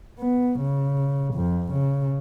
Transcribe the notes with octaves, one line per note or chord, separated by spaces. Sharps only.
B3
C#3
F2
C#3